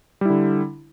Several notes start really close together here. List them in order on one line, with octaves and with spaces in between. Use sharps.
G3 E4 D3